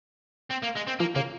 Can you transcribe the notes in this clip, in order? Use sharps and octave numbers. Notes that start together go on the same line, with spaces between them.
C4
A#3
G#3
C4
F3 A#3
C#3 A#3